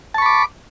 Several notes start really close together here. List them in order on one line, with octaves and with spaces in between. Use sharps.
A5 C#6 B5 D6